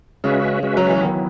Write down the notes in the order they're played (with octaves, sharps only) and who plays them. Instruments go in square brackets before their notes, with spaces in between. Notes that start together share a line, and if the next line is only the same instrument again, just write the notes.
[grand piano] C#3 [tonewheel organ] G#3 C#4 F#4 B4 E5
[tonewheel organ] G#3 C#4 F#4 B4 E5
[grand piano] F#3
E3
[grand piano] D#3 [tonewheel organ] F#3 B3 E4